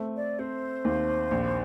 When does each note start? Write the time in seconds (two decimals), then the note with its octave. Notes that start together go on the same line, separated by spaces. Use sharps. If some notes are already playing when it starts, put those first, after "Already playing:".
Already playing: A3 C4
0.16 D5
0.39 C4 C5
0.85 D#2
1.31 A#1